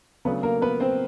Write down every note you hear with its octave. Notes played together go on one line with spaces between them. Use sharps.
C#3 F#3 A3 B3 D4 B4
A#3 A#4
B3 B4
C4 C5